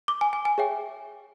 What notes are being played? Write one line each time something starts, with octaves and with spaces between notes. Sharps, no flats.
D6
G#5
G#5
G#5
G#4 C#5 E5 G5